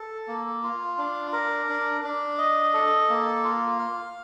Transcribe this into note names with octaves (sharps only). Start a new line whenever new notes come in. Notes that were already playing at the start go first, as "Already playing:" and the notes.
Already playing: A4
A#3
F4
D4
A#4
D4
D4
D#5
A4
A#3
F4
F5